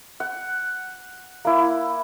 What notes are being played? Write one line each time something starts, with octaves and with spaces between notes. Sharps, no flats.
F#5
A#3 E4